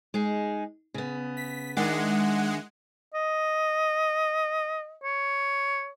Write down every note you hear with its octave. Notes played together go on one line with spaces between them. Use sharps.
G#3 D#4 G#4
C#3 B3
B6
D#3 G#3 D4 E5 F#5
D#5
C#5